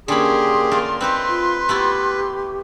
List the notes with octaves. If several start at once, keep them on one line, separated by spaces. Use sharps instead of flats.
D3 A#3 C#4 G4 G#4 B5 C6
A3 F4 A#4
C4 D#4 G4 B4
F4
A3 B3 E4 G4